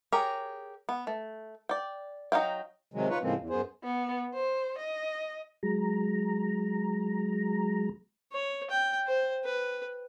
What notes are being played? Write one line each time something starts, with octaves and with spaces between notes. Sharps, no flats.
G4 G#4 A#4 C#5
B3
A3
D5 G5
F#3 D#4 C5 F5 G5
C3 D#3 F#3 G#3
D#4 F4 B4 C#5
A2 C#3 F3 G#3 A#3 C4
E2
F#2 B3 G#4 C5
B3
C5
D#5
F#3 G#3 A#5
C#5
G5
C5
B4